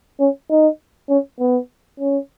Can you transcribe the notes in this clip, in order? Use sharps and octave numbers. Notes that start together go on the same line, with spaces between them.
C#4
D#4
C#4
B3
C#4